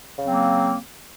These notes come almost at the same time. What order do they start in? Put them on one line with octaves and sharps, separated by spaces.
C#3 F#3 C4 A#3